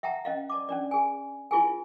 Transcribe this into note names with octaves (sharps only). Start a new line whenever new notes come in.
E5 F#5 G5 A5 A#5
C#4 D#5 F5
D5 A5 D6
C#4 D4 D5
G#4 G#5
E4 F4 G#4 G#5